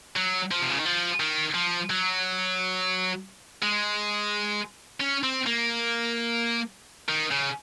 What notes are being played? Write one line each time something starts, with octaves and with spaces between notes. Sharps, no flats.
F#3
F3
C3
C#3
D#3
F3
D#3
F3
F#3
G#3
C#4
C4
A#3
D#3
C#3